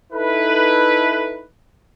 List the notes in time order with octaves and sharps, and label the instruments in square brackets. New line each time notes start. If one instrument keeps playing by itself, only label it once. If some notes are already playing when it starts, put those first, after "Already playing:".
[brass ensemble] D#4 E4 A4 B4